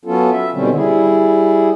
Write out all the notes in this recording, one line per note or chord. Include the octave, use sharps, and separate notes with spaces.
F#3 B3 C#4 F4 A4
E5
B2 D3 D#3 G3 C4 C#4
G3 E4 G#4